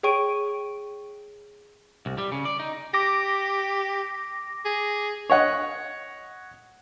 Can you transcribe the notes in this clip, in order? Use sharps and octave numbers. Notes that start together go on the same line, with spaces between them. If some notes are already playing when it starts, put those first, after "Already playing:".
G#4 C#5 G5 C#6 D7 D#7
C2
G3
C#3
D5
D#4
G4 D6 A#6
G#4
C#5 D#5 F#5